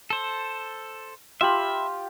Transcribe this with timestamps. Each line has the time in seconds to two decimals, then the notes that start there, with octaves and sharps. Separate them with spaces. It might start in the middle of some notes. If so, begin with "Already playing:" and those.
0.10 A4 C5
1.41 F4 G4 E5 B5